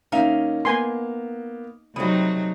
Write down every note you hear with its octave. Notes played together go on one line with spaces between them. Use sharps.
D#3 A#3 C#4 D#4 E5 F5
A#3 B3 G#5 C6
C3 F#3 G3 A3 D#4 D#6